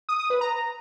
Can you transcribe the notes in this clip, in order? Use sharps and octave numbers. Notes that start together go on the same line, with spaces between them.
D#6
D#6
B4
A#5